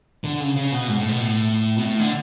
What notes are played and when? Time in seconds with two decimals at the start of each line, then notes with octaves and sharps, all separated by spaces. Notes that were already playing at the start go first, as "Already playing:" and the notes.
0.24 D3
0.40 C#3
0.56 C#3
0.72 B2
0.87 G#2
0.98 A2
1.09 B2
1.20 A2
1.78 B2
1.84 A2
1.99 D3